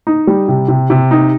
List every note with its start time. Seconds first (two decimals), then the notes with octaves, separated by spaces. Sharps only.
0.07 D#4
0.27 G3
0.48 C3
0.68 C3
0.90 C3
1.11 D#4